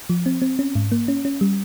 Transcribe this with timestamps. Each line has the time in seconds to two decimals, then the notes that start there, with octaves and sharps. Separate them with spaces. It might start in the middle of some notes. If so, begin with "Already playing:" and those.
0.10 F3
0.26 C4
0.42 C4
0.59 C#4
0.75 G#2
0.92 A#3
1.08 C#4
1.25 C#4
1.41 G3